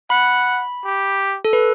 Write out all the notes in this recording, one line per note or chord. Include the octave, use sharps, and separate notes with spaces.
F#5 B5
G4
A4
B4